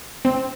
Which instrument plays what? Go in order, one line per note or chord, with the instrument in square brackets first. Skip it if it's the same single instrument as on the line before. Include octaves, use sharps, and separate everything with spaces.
[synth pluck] C4